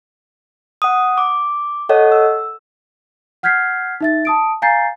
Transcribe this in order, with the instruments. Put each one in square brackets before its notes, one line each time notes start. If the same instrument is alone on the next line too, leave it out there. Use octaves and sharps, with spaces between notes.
[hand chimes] F#5 D#6
D6
A4 C#5 D#5 F#5
E6
[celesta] F#5 F6 G6 G#6 B6 C7
D#4 E5 A6
A5 D#6 D7
F5 G#5 A#5 G6 A6 C7